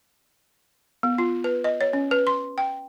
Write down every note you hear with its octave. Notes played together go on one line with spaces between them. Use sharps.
B3
F4
B4
D#5
C#5
C#4
B4
C6
G5